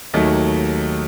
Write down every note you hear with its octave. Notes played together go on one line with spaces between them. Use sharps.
D#2 D#3 F#3 A3 D#4